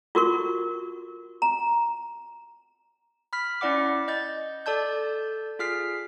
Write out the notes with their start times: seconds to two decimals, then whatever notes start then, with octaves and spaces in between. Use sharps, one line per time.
0.15 F4 F#4 A#4 C#6
1.42 A#5
3.33 B5 F6 B6
3.61 C#4 E4 D5 F#5 D6
4.08 D#5 G6 A6
4.66 A4 D5 A5 G6
5.59 F4 G#4 F6 B6 C7